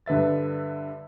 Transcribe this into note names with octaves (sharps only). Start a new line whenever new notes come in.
G2 D3 B4 E5 A6